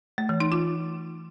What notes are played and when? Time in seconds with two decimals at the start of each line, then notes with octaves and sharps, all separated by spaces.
0.18 A3
0.29 E3
0.40 D#4
0.52 F4